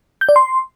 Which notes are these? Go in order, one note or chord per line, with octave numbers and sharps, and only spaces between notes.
G6
D5
C6